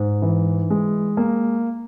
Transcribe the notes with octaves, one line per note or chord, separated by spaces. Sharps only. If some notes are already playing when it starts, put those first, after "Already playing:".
Already playing: G#2
E3
G#3
A#3